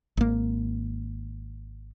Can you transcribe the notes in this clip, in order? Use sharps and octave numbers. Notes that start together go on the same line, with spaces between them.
G#1 A#3